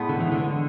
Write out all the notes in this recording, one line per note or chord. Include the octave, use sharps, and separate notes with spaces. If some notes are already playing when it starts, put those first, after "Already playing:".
Already playing: A2 G#3 B3
D3
E3
D3